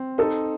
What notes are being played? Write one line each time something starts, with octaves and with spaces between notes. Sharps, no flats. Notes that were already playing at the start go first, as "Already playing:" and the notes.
Already playing: C4
D#4 A4